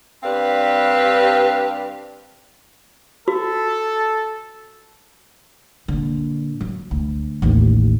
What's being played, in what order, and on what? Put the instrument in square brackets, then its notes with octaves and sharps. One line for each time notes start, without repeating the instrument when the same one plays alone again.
[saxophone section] G2 C4 D4 G4 B4 F5
[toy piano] F#4 [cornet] A4
[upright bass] A#2 D3
F#3
D2
A1 D#2